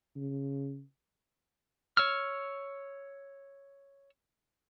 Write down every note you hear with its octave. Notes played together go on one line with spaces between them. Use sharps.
C#3
C#5 E6 F6